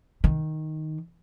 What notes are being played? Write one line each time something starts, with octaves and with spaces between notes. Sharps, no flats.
D#3